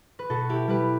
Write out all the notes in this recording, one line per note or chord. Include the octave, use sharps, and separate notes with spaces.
B4
B2 F#4 A4
E4 G4
G3 G4 B4